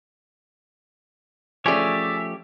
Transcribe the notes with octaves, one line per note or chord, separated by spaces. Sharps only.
F3 A3 C#4 G4 G#4 C#5 D5 E5